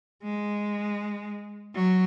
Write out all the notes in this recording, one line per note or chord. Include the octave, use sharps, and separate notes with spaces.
G#3
F#3